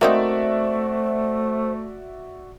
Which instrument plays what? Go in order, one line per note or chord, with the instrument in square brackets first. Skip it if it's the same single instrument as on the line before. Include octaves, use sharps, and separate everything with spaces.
[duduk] A3 [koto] A#3 C4 D#4 [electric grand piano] F#4 D5 E5 [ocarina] C5